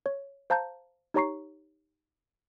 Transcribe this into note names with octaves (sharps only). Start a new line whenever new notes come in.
C#5
C5 F5 A5 A#5 G6
D#4 G4 C#5 A#5 C#6 C7